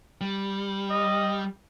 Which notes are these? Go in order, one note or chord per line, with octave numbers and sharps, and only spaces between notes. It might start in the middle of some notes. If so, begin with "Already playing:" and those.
G3
D#5